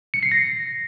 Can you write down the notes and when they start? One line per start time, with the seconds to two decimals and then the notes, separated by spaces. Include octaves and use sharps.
0.14 C#7
0.23 C7
0.32 A#6